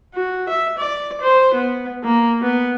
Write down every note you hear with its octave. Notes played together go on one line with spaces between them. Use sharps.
F#4
E5
D5
C5
B3
A#3
B3